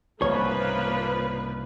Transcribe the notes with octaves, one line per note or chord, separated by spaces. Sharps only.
C2 G#2 C#3 F3 A#3 B4 C#5